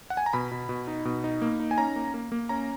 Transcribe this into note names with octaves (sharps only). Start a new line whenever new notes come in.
F#5
G#5
A#5
B2 B5
B2
B2
D#4
B2
D#4
A#3
D#4
G#5
C#4 A#5
A#3
A#3
A#3
C#4 A#5